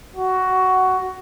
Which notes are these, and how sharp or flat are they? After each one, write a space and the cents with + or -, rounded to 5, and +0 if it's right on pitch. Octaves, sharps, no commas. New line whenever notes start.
F#4 +10